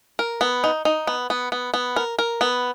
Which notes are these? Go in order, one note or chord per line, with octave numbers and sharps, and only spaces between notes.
A#4
B3
D#4
D#4
B3
B3
B3
B3
A#4
A#4
B3